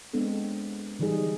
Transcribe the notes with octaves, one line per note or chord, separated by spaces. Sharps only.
G#3 B3 C4 D4 A4
D3 E3 G3 D#4 G#4